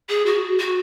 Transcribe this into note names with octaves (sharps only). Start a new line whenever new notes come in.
G#4
F#4
F#4